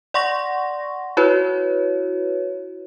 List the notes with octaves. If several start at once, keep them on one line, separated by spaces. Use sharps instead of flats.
D5 F#5 C6 C#6 A#6
E4 F#4 B4 C#5